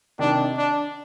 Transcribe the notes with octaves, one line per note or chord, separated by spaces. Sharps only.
C3 D#3 D4
D4